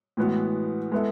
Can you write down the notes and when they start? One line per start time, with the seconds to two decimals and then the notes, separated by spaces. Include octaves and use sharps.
0.17 A2 E3 G#3 B3 F#4
0.92 G#3 B3 E4 A4